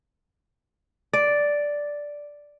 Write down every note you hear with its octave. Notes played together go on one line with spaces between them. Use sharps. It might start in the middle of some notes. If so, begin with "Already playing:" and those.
D5